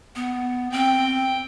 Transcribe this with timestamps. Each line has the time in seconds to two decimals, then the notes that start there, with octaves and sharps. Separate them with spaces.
0.16 B3
0.72 C4 G5